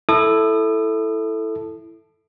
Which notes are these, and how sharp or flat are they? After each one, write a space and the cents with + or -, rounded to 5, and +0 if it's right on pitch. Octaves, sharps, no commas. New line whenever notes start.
E4 +0 A4 +0 D#6 -40